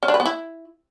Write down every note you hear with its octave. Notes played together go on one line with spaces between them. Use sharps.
C#4
D4
B4
B3
E4